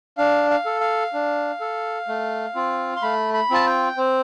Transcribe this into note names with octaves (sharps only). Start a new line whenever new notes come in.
D4 F5
F5
A4
F5
D4
A4
A3
C4 F4
C6
A3 B5
B5
C4 F4 A5
G5
C4 C5